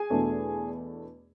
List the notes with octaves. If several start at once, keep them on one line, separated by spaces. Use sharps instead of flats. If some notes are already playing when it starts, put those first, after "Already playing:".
Already playing: G#4 G#5
E2 B2 A3 D4